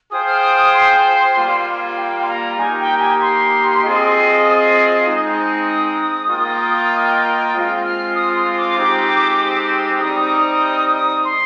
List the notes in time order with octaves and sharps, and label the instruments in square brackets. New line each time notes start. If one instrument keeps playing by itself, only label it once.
[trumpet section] F4 G#4 C5 G5 [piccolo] D#6
[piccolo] F6
D#6
D#6
C6
[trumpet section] G3 A#3 F4
[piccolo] G5
C6
A#5
[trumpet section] A#3 D#4 G4 [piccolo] G#5
[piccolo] G5
G#5
C6
[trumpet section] C4 F4 G#4 D#5
G#3 C4 D#4
[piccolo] D#6
[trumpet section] A#3 F4 A#4 D#5 G5
G#3 C4 F4
[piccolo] F6
D#6
C6
D6
[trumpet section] G#3 C4 D#4 G4
[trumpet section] G3 C4 D#4 [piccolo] D#6
[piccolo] D#6
D#6
C6